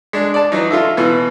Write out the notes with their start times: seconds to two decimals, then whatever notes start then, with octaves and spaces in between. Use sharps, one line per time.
0.13 G#3 D4
0.34 D5 A5
0.52 E3 F#3 D#4
0.71 F4 A4 E5
0.97 B2 E3